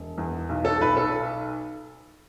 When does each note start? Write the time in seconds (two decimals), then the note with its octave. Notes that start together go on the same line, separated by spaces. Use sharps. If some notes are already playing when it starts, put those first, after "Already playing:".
Already playing: E1
0.18 E2
0.49 B1
0.65 A4
0.80 B1 B4
0.97 A4